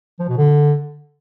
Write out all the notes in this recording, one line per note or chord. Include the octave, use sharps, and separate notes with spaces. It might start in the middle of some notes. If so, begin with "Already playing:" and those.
F3
B2
D3